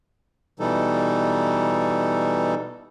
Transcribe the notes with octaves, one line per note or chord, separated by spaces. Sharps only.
B2 E3 G3 D#4 A4